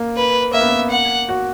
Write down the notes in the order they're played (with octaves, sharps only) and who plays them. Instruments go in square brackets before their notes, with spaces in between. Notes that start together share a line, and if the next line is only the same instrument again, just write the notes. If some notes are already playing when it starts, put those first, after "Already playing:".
Already playing: [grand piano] A#3
[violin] B4
[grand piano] A#3 [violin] E5
[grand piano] B3
A#3
[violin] F#5
[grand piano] F#4